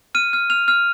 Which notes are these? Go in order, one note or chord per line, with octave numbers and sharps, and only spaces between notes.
F6 D#7
F6
F6 F7
F6